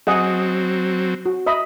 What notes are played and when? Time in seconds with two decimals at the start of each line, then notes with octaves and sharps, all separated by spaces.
0.07 F#3 C4 G#4 D#5 F#5
1.26 F#4
1.46 D#5 E5 B5